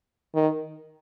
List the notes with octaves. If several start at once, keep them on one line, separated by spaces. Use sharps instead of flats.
D#3